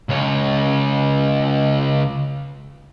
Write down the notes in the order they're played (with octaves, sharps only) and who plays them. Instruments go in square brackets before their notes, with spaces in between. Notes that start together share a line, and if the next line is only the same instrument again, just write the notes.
[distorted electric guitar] C#2 C#5